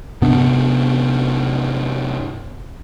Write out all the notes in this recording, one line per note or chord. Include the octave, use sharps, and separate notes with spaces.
G2 C3 B3 D4